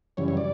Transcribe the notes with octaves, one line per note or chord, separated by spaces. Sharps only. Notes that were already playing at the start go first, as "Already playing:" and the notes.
F#2 C#3 E3 G3 C#5
C#5
D5